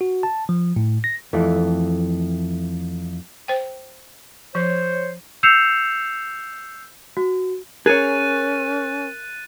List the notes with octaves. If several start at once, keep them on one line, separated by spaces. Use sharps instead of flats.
F#4
A5
F3
A2
A#6
F2 E3 A3
C5 G5
F3 C5 C#5
E6 G6 C7 C#7 E7 F7
F#4
C#4 G#4 A#4 C#5 F#6 A6 D#7